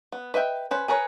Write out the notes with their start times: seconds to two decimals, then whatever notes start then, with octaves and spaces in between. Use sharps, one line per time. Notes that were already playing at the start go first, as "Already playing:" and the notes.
0.12 B3
0.34 B4 D#5 E5 G5
0.71 C#4 B4 C5
0.88 G#4 A#4 B4 C#5